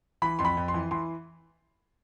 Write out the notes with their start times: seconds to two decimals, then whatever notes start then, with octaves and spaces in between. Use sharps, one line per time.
0.22 E3 B5
0.39 F2 C6
0.45 B5
0.57 F2
0.68 C6
0.74 E3
0.91 E3 C6